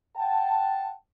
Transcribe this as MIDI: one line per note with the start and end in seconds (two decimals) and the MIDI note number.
0.17 0.90 78
0.17 0.90 79
0.17 0.90 81